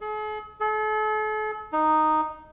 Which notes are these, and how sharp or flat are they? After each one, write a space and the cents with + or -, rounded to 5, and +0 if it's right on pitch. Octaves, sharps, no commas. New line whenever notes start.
G#4 +45
A4 -40
D#4 -5